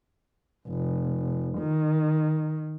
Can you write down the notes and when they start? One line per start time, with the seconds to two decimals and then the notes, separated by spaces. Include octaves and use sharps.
0.68 F1
1.58 D#3